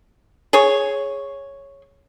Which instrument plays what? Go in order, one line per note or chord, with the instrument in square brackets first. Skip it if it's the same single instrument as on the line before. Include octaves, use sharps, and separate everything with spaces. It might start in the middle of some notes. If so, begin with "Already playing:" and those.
[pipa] G#4 C#5